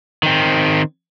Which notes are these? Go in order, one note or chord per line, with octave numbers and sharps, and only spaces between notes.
D#3 C4